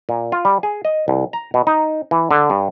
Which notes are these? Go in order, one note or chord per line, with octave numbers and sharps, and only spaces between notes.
A#2
F4
G3
G#4
D#5
C2
A#5
B2
D#4
E3
D3
G2